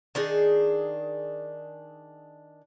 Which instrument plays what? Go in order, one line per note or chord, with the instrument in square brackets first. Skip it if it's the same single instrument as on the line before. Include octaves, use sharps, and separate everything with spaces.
[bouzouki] D#3 D4 D#4 G#4